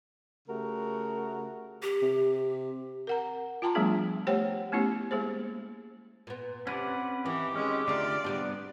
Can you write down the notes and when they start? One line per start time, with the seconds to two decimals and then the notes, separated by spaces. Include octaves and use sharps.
0.48 C#3 A3 F#4 G4 A#4
1.82 G4
2.02 C3
3.07 A#4 F#5 A#5
3.62 F4 G5 A5 A#5 C6
3.75 F3 G3 A3 B3 D4 G#4
4.27 A3 G4 C5 C#5 F#5 G5
4.72 A3 B3 C#4 E4 G4
5.11 G#3 A#3 G#4 C5
6.27 A#2 B3
6.67 C3 C#4 B4 D5 F#5
7.25 D#3 E3 G4
7.56 G#3 C#4
7.88 D3 A3 D#4 F4 D5
8.24 C3 G3 B3 D4